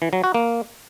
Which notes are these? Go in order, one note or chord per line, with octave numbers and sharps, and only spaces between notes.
E3
F#3
F#4
A#3